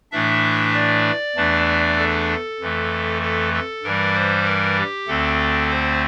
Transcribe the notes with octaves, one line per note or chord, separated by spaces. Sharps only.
A2 E3 A3 D4 E5
D5
E2 E3 A3 D4
A4
F2 E3 A3
A4
A4
G2 E3 G3 A#4
C5
A#4
G4
D2 D3 A3 C4 A4
C5